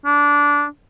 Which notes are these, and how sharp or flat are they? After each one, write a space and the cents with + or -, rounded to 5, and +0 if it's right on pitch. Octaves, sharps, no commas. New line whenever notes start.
D4 -15